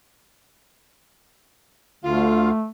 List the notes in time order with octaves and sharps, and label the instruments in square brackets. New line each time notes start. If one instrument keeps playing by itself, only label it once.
[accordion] D2 D3 F5 [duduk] A3 [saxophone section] F4